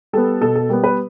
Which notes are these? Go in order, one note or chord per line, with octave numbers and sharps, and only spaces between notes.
G3 B3 A4
B2 A4
A4
G3 B3 A#4
B4